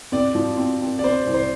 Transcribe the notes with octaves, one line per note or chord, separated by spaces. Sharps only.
C4 D5
F3
C4
C4
D5
C4 C5
C2
C5